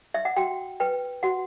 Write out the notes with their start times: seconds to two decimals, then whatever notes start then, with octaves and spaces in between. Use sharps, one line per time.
0.14 E5
0.25 F#5
0.37 F#4 G5
0.80 B4 G5
1.23 F#4 F#5